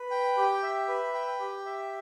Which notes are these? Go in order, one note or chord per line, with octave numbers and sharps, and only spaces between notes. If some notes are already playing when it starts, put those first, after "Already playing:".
Already playing: B4
G5
G4
E5
B4
G5
G4
E5